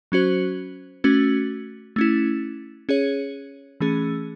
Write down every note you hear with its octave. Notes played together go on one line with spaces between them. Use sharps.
F#3 C#4 F#4 C5
A3 C#4 F#4
A3 C#4 E4
C#4 G#4 C#5
E3 A3 C#4 G#4